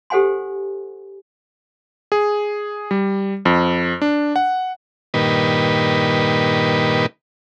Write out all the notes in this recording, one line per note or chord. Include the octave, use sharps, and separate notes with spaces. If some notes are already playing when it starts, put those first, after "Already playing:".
G4 A4 C5 F#5 G#5 C6
G#4
G3
F2
D4
F#5
G2 A#2 D#3 B4